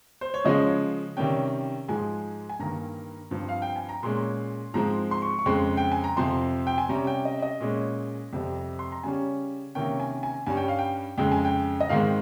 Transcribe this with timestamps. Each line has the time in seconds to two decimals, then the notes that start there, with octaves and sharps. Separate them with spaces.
0.21 C5
0.34 C#5
0.44 C#3 F3 G#3 C#4 D#5
1.17 C3 D#3 G3 C#4 G5
1.88 G#2 F3 G#3 G#5
2.49 G#5
2.59 G2 D#3 A#3 A#5
3.31 G2 F3 C4
3.49 F5
3.62 G5
3.76 G#5
3.89 A#5
4.03 A#2 G#3 C#4 C6
4.74 G#2 F3 G#3 C4 A#5
5.11 C6
5.22 C#6
5.39 C#6
5.46 F2 C#3 G#3 C4 C6
5.77 G5
5.92 G#5
6.04 A#5
6.17 F2 C3 F3 C4 C6
6.67 G5
6.78 G#5
6.89 C3 G3 C#4 A#5
7.07 G5
7.25 D#5
7.42 D#5
7.60 A#2 G#3 C#4
8.33 F2 C3 G3 C4
8.79 C6
8.92 A#5
9.03 C#3 G3 C#4 G#5
9.75 C3 D#3 A#3 C#4 G5
10.00 G#5
10.23 G#5
10.46 G2 G3 C#4 G#5
10.57 G5
10.68 F5
10.79 G5
11.18 F2 C#3 G#3 G5
11.32 G#5
11.45 G5
11.81 D#5
11.89 G#2 D#3 G#3 C4 F5